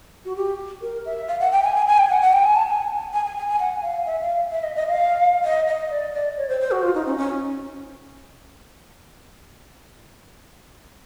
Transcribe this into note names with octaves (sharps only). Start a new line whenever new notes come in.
F#4
G4
A#4
E5
F5
F#5
G5
G#5
G#5
G#5
G5
F#5
F#5
G5
G#5
A5
G#5
G#5
G#5
G#5
G#5
F#5
F5
E5
F5
E5
D#5
D#5
F5
D#5
D#5
D5
D5
C#5
C5
C5
F#4
F4
D#4
C#4
C#4